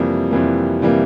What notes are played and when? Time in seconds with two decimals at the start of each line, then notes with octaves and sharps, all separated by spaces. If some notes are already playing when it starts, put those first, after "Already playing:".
Already playing: F2 C3 E3 G3 A#3
0.31 F2 C3 E3 G3 A#3
0.82 C3 E3 G3 A#3